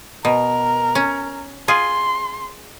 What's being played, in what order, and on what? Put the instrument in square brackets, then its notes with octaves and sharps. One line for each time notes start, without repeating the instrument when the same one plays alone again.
[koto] B2 [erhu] A#4
[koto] C#4
[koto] F4 G#4 [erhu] C6